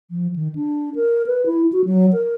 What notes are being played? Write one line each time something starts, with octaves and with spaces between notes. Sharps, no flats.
F3
D#3
D4
A#4
B4
E4
F#4
F#3
A#4